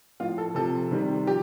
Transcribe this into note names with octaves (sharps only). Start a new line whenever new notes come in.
A2 F3 F4
A4
C3 F3 A4
C3 D#3 G3
F3 G4